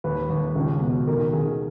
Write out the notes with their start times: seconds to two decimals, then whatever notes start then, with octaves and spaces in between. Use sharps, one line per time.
0.04 D#2 B4
0.30 D#2
0.56 C#2
0.82 B2
1.07 D#3 A#4
1.33 D#3 G#4